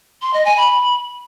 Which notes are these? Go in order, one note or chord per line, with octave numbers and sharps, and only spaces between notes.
C6
D#5
G#5
B5